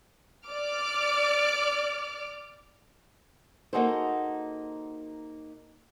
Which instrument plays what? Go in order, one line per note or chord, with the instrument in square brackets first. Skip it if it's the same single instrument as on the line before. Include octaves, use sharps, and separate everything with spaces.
[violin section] D5 D6 F6 D7
[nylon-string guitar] A#3 D#4 F#4 G#4 A4 C5